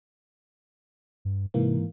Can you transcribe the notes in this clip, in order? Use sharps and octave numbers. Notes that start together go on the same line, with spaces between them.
G2
G#2 C3 E3 A#3